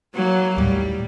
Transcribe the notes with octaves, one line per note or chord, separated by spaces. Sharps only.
F#3 A#3
D#2 A2 G3